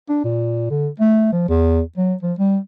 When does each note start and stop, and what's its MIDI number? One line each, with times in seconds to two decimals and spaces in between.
0.09 0.22 62
0.24 0.70 46
0.70 0.88 50
1.00 1.28 57
1.33 1.45 53
1.49 1.80 40
1.98 2.14 54
2.23 2.33 53
2.39 2.58 55